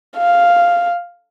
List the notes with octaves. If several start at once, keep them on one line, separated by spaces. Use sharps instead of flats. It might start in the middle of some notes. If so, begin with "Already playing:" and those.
F5